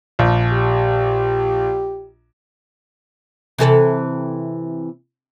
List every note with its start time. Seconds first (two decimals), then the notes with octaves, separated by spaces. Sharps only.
0.19 A#1
0.53 G4
3.58 C3 E3 A4